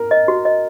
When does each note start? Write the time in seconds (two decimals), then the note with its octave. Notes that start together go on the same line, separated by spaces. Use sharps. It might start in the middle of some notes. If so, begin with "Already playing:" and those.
Already playing: A#4
0.11 D#5
0.28 F#4
0.45 D#5